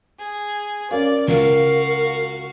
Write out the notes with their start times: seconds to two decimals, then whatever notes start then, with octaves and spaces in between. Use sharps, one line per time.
0.19 G#4
0.91 C#4 A#4 D5 F5
1.28 C#2 F#4 A#4 F5